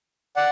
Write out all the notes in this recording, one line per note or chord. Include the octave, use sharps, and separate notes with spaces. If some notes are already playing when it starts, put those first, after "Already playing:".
D5 F#5